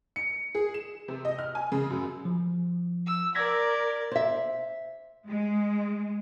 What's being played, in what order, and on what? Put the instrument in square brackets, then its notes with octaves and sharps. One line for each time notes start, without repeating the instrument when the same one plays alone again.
[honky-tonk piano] C#7
G#4
E7
C3
D#5
F6
G#5
C#3
F#2
[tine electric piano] F3
[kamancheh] E6
[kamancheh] A#4 D5 [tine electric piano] G#6 A#6 B6
[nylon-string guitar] C5 E5
[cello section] G#3